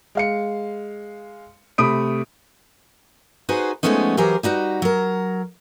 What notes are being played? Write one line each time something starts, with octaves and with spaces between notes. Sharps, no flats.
G#3 F5 C#7
C3 A3 B5 D#6 D7
D#4 F#4 G#4 B4 C5
F3 G#3 A3 B3 C#4 D#4
E3 F#3 G4 G#4 A#4 C5
G3 D#4 F#4 B4
F#3 A#4